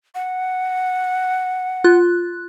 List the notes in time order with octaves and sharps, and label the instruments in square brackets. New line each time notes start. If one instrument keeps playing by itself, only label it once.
[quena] F#5
[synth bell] F4 F#6